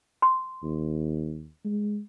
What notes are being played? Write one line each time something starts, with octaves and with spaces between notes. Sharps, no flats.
C6
D#2
G#3